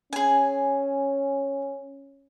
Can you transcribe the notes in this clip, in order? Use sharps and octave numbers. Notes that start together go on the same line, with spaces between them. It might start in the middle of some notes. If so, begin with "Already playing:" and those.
C#4 G#4 G#5